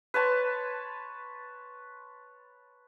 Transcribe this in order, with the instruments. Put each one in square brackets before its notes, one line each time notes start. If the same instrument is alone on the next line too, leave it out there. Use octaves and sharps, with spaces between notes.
[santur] B4 C#5 A5 C6